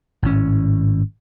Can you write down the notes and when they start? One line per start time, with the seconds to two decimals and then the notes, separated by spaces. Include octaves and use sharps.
0.23 G#1 A2 C#4